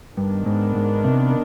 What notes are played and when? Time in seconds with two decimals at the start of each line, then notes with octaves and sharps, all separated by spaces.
0.17 G2 D#3 B3 D4
0.46 G#2
0.76 G#2
1.04 C3